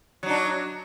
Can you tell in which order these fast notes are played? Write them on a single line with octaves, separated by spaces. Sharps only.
F#3 D#4 D4